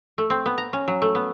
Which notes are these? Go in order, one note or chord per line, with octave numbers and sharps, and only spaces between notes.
A3
C4
B3
A#5
C#4
F#3
A3
B3